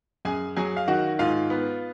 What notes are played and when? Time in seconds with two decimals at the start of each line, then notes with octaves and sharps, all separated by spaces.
0.25 F#2 G#4 G#5
0.56 F#3 G#4 G#5
0.77 F5
0.88 D#3 F#4 F#5
1.19 G#2 F4 F5
1.50 B3